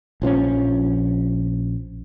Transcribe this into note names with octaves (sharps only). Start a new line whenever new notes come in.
A#1 F3 C4 C#4